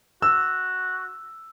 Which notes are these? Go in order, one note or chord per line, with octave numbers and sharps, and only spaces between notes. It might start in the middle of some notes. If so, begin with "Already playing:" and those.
F#4 E6